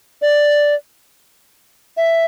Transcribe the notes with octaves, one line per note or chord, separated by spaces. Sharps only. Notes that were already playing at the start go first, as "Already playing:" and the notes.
D5
E5